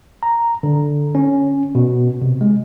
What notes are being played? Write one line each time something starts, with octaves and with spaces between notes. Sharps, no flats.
A#5
D3
C#4
B2
C3
G#3